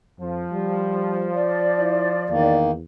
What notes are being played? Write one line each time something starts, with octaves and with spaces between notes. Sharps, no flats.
F2 F3
G3
D5
E4
E2 D#3 A#3